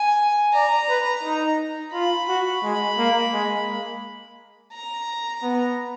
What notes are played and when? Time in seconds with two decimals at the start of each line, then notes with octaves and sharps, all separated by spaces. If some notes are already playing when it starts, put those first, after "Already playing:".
Already playing: G#5
0.54 D5 A#5
0.89 B4
1.23 D#4
1.93 F4 B5
2.28 F#4
2.63 G#3
2.98 A#3
3.33 G#3
3.68 A#3
4.73 A#5
5.42 B3